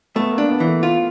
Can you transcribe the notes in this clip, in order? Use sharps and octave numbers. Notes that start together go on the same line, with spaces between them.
A3 B3
A#3
D4
B3
E3
A3
F4